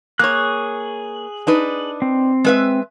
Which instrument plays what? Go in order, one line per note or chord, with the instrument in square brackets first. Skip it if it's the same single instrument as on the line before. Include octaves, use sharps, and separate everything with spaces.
[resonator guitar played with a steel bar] A#3 C#5 [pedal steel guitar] G#4 F#6
[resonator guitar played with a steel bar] D4 D#4 B4
[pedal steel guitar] C4
[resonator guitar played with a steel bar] G#3 B4 E5